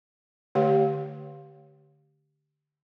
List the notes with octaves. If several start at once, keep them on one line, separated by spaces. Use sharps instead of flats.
D3 A3 G4 C#5 F5